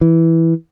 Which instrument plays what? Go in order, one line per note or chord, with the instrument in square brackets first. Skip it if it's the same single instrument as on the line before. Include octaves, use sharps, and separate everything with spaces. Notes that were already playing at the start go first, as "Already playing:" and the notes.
[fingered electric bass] E3